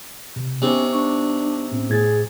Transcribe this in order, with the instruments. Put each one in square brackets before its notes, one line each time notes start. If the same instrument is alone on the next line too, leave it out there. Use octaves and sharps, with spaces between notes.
[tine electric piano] C3
[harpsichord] C3 [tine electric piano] B3 D#4 [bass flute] C#4
[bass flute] D4 [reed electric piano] C#6
[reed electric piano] A2 C4 C#4
[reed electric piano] A2 G#6 A6 [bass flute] G#4